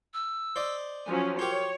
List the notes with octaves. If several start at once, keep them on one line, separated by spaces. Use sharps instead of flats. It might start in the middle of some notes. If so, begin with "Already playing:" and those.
E6
C5 D5 D#5
F3 F#3 C#4 G#5
G4 A#4 C5 C#5